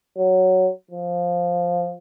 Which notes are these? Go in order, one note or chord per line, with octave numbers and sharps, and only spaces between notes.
F#3
F3